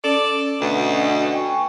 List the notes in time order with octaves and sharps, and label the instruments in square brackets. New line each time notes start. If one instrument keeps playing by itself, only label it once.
[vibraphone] C#4 [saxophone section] A4 D5
[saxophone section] D2 B2
[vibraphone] G5 G#5 C#6